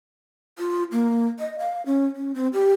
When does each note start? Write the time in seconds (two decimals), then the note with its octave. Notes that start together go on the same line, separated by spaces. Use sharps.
0.59 F4
0.92 A#3
1.40 D#5
1.59 F5
1.86 C#4
2.16 C#4
2.35 C4
2.53 G4